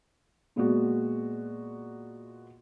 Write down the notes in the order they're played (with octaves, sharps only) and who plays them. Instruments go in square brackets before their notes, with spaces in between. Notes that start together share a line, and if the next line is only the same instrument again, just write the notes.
[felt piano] A#2 G#3 A#3 B3 F#4